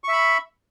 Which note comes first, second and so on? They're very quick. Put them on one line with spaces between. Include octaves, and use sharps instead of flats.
C#6 E5 B5